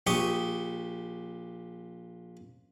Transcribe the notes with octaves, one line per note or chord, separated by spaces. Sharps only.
A#1 G4 C#6 D#6